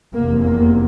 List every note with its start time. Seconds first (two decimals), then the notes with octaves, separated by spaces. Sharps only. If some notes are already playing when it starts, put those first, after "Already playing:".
0.13 F1 E2 C3 A#3
0.43 A#3